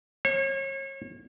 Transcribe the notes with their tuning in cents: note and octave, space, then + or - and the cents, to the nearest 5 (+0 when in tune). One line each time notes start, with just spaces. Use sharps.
C#5 -35